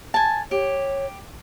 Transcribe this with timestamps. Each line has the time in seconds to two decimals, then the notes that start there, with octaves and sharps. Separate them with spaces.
0.14 G#5 A5
0.51 G4 C#5